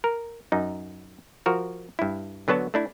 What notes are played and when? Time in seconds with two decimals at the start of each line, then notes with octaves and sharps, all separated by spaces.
0.04 A#4
0.52 F#2 D#4
1.46 F3 F#4 A#4
1.99 G2 E4
2.48 D3 F#3 B3 F#4 A5
2.74 A3 D4 E4